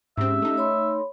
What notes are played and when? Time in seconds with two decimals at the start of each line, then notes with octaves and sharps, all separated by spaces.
0.18 G#2 C4 C#4 G4 E5
0.42 A3 D#4
0.58 C#5 B5 C6